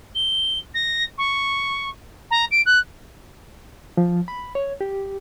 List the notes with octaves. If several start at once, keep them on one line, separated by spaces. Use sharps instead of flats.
G7
A#6
C#6
A#5
D7
F#6
F3
B5
C#5
G4